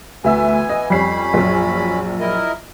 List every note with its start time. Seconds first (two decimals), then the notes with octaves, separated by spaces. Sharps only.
0.24 D2 E3 B3 E5 G#5 E6
0.69 D#5
0.90 F2 G3 C#4 B5 C7
1.34 A#1 F#2
2.20 E4 A#4 D#5